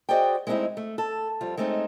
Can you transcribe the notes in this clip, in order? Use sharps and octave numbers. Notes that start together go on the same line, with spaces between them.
F#4 G#4 C5 D5 D#5 G5
G#3 A3 C4 C#4 D#4 E4
A3
A4
F2 G3 F4
G#3 A3 C4 C#4 D#4